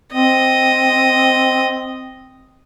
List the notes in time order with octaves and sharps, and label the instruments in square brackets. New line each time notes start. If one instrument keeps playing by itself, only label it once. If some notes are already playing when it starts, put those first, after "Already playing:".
[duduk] C4 [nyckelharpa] D#5